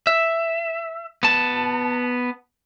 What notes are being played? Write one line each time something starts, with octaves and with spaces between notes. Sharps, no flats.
E5
B3 A5